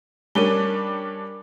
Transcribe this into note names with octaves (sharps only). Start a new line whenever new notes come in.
G3 C#4 D4 A#4 G7